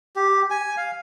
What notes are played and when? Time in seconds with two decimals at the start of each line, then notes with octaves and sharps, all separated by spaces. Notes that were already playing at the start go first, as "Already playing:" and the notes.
0.16 G4
0.50 G#5
0.77 F5